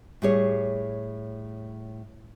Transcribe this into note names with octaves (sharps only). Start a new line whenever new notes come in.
A2 G3 G#4 C#5